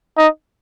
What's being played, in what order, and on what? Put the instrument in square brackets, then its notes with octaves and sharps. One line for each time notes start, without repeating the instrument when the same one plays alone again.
[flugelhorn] D#4